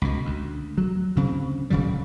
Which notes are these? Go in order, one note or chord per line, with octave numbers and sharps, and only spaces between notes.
C#2 B2
D2
F#3
D2 C#3 C4
D#1 C#3 F#3 G3